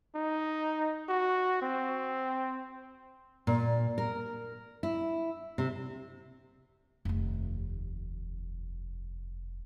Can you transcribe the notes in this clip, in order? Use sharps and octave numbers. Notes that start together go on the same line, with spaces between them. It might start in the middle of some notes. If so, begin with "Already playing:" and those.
D#4
F#4
C4
A#2
A#4
E4
C3
F1 D#2